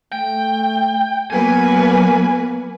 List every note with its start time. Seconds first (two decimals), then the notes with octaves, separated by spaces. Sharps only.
0.12 A3 G5
1.30 F#3 A#3 B3 B4 G#5